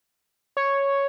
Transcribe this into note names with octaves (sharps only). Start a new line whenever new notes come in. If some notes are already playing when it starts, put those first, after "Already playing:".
C#5